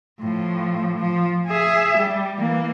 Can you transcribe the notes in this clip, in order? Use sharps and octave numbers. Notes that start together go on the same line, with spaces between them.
A2 F3
F3
G#4 E5
G3
E3 A#3